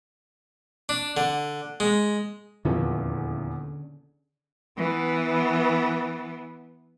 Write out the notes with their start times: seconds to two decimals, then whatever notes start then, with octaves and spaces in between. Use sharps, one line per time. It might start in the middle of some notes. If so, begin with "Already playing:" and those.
0.89 D4
1.17 D3
1.80 G#3
2.65 D#1 E2 D3 F3 C#4
4.78 E3 B3